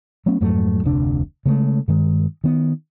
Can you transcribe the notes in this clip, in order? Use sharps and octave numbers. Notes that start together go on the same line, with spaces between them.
F#3 A3 B3 C#4
F2 G#2 F#3 A3
F1 D2 C3 D4
C#3 G#3 A3
G2 D#3 G#3
D#3 B3